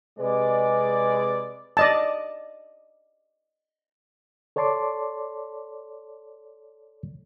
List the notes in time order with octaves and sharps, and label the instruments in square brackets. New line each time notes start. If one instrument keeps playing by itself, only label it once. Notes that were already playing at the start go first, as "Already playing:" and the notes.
[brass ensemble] C3 G#3 B4 D5
[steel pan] D5 D#5 A5
[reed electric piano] A4 C#5 D5 A5 C6 D6